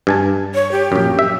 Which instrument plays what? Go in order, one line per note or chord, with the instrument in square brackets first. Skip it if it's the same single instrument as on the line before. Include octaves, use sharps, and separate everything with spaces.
[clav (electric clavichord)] G2 G#5 A5
[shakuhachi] C#5
G4
[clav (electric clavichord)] A#1 F#2
E5